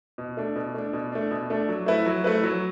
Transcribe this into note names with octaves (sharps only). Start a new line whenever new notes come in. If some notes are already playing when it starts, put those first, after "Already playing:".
B2
A3 D4
B2
A3 D4
B2
A3 D4
B2
A3 D4
F#3
A3 E4 B4
F#3
A3 E4 B4
F#3